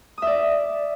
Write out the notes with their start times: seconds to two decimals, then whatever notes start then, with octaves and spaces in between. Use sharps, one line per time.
0.18 D#6
0.22 E5
0.27 D5